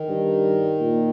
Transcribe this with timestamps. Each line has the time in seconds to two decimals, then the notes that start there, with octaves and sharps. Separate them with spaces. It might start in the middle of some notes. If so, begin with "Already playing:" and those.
Already playing: D#3
0.08 G2
0.80 A#2